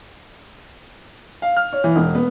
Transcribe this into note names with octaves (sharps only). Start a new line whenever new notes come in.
F5
F6
C#5
E3
E1
B3